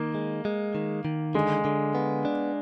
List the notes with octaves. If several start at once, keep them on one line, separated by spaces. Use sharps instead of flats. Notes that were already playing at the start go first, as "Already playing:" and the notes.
Already playing: D#3 A#3
G#3
G#3
D#3
D#3
D3 G#3
D3
B3
D4